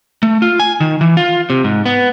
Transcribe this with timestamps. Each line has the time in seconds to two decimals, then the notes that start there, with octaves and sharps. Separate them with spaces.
0.23 A3
0.42 F4
0.60 G#5
0.80 D#3
1.01 E3
1.17 F4
1.50 C3
1.64 G#2
1.86 B3